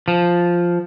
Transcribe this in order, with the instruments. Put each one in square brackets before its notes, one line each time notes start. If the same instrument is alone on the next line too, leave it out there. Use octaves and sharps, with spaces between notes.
[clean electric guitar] F3